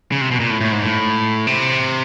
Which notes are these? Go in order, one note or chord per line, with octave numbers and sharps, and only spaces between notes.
C#3
C3
B2
A#2
A2
A2
G#2
A2
C3